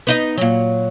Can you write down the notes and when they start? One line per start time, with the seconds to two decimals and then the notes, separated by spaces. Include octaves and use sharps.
0.07 B3 D#4 D#5
0.37 A#2 F#3